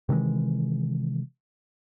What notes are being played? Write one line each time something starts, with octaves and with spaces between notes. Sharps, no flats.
C3 D#3 E3 G#3